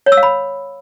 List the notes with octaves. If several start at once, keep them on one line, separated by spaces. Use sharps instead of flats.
C#5
E6
F5
B5